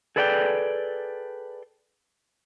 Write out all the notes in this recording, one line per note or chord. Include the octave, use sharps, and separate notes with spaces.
G#4 A4 B4 D5 F#5 G5